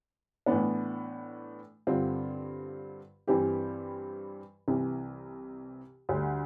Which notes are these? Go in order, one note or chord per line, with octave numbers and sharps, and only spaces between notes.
A2 E3 B3 D4
G2 D3 G3 C4 F4
G2 E3 G3 C4 G4
C2 C3 E3
D2 D3 G3